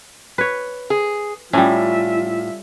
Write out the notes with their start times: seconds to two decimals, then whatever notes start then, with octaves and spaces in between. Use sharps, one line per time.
0.38 B4 C#5
0.90 G#4
1.53 A2 G3 C#4 F4 E5